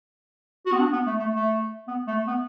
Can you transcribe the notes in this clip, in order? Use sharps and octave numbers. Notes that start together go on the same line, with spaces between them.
F#4
B3
D4
B3
A3
A3
A3
B3
A3
B3